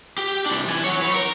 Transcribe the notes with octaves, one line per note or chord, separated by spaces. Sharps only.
G4
C2 D4
E3 G#5
F#3 C#5
B4 C#5
A#4